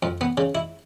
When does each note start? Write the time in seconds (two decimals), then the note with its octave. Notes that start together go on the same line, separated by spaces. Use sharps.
0.03 F2
0.21 B3
0.37 C#3
0.55 E4